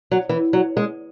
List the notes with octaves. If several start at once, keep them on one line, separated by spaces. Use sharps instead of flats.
F#3
E3
F#3
G#3